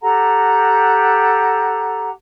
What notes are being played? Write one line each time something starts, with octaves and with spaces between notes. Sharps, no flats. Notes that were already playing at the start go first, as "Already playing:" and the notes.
G4 A4 F#5 A#5